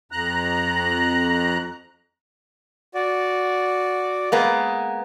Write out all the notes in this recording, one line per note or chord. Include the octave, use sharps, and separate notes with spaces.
F2 A#5 F#6
F#4 D5
G#3 A#3 B3